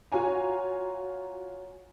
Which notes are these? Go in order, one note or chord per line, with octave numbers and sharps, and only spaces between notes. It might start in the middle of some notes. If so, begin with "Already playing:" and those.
F4 F#4 C#5 G#5 A#5